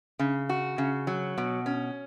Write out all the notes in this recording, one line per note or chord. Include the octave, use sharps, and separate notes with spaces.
C#3
F#4
C#3
F#3
B2
C#4